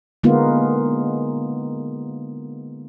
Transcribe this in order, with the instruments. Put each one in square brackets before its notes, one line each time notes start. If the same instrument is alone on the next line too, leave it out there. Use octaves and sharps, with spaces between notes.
[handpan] D3 G#3 A#3 B3 D#4 F4